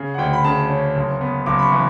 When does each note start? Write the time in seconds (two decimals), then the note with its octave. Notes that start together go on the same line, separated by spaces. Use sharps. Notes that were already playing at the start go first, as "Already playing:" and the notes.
Already playing: C#3
0.14 F#5
0.18 D2 G5
0.33 B5
0.44 C#3 A5
0.69 C#4
0.95 F#1
1.21 B3
1.46 F#1 D6
1.59 B5
1.63 C#6
1.72 E3